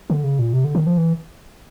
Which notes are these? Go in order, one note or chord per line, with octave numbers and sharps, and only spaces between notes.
D3
C#3
A#2
C3
D3
D#3
F3
E3